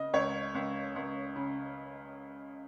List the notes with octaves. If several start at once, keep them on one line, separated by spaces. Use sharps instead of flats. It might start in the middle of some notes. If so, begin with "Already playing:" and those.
Already playing: C#3 D#5
C#2 C#5
C#2
C#2
C#3